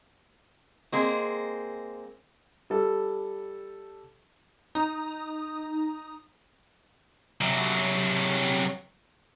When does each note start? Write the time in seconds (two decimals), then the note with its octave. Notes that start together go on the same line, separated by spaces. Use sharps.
0.92 G#3 A#3 C4
2.70 G3 A4
4.75 D#4 A#5 D#6
7.41 C3 F#3